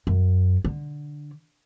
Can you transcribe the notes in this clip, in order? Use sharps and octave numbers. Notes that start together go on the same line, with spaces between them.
F#2
D3